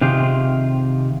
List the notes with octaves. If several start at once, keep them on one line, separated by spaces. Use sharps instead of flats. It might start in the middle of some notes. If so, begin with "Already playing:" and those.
C3 D#3 F4 G4 G#4